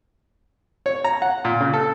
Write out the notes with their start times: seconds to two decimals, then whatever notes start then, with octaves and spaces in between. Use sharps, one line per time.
0.86 C#5
1.04 A#5
1.22 F#5
1.45 A#2
1.60 C#3
1.74 A4